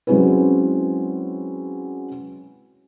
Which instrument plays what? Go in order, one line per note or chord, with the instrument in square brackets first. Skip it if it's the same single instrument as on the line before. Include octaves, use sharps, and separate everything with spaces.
[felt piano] F#3 G#3 C4 C#4 E4 B4